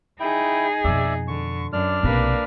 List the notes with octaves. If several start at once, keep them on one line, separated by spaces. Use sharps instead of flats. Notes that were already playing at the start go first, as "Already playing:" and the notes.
D#4 E4 G#4 G5
F2 B2 D5 E5
D3 C#6
F#2 D4 D5 F6
B1 C3 A#3 B4